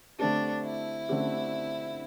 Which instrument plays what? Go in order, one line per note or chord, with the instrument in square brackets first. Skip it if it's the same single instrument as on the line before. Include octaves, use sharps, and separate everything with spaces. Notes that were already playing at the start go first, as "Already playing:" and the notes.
[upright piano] D3 A3 C4 G4 [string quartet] D4
[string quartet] E4
[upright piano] D3 A3 C4 G4